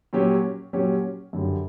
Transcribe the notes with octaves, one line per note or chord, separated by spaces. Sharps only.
A#2 F#3 C#4 G4
A#2 F#3 C#4 G4
F#2 D3 G3